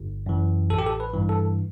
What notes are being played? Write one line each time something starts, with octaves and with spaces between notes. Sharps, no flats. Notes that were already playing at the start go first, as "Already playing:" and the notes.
Already playing: G1
F#2 E3
A1 A4
G4
A4
B4
G2 E3
A4